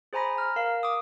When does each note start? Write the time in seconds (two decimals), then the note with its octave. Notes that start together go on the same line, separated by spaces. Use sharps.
0.13 G#4 C5 G#5 A#5 B5 A#6
0.38 A#5 F6
0.56 A#4 F5
0.83 D6 D#6